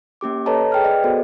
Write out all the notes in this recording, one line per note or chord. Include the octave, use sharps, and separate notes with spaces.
A#3 C#4 G4 D6
A4 B4 C#5 D#5 A5 A#5
G#4 G5 F6
G#4 B4 D5 D#5
B3 F#4 A4 C5